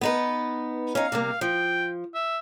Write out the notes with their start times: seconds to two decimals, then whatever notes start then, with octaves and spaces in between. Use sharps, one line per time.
0.01 B3 D#4 B4
0.95 C#4 D#4 F5
1.12 C3 G3 A#3
1.41 F3 G5
2.14 E5